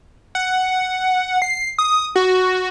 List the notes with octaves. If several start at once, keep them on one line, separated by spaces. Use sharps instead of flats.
F#5
C7
D#6
F#4